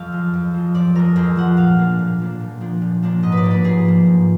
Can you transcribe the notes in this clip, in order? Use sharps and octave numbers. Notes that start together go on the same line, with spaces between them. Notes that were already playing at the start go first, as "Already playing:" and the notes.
Already playing: F2 F5
F3 G#3
F2
F3 G#3
F2 D5
F3 G#3 A#4
F2 G#4
F3 G#3 F#5
A#2 F5
F3 A#3 D4
A#2
F3 A#3 D4
A#2
F3 A#3 D4
A#2
F3 A#3 D4
G#2 D#5
B4
D5
F3 A#3
B4
G#2 G#4
F3 A#3
G#2